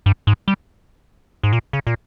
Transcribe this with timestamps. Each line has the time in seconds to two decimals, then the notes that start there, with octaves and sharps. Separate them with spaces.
0.06 G2
0.27 G#2
0.48 G3
1.43 G#2
1.53 A#2
1.73 C#3
1.87 A#2